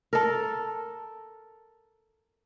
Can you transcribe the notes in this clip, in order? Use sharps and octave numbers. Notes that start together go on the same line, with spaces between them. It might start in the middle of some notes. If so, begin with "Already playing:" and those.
A4 A#4